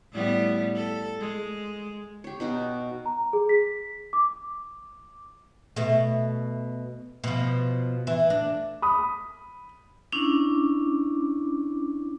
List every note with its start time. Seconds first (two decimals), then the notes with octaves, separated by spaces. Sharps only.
0.12 A2 G3 B3
0.75 A4
1.20 G#3
2.24 G4 C#5
2.40 B2 D#4 F#4
3.06 A#5
3.33 G#4
3.49 B6
4.13 D6
5.76 B2 A3
7.24 B2 F3
8.07 E3
8.30 D4
8.82 B5 D#6
10.12 C#4 D4 E4 D6